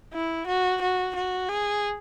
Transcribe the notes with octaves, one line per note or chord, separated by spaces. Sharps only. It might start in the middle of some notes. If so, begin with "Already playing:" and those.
E4
F#4
F#4
F#4
G#4